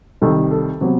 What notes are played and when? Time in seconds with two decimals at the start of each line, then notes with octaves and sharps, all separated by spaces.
0.22 C2 C3 D#3 G3 A4
0.51 A4
0.81 C3 F#3 B3